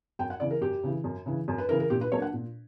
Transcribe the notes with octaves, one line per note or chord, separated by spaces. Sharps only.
F#2 G5
F#5
C#3 E3 D5
A#4
F#2 G4
C#3 E3
F#2
C#3 E3
F#2
B4
C#3 E3 A#4
A#4
A#2 G4
B4
F#3 A#3 D4 C#5
F#5
A#2